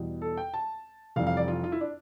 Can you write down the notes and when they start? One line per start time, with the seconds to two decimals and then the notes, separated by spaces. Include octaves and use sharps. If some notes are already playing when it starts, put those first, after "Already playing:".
Already playing: E2 B2 G3
0.22 A4
0.37 G5
0.54 A5
1.16 F1 F2 E3 G3 F5
1.27 F5
1.37 D5
1.48 F4
1.64 F4
1.72 E4
1.81 D4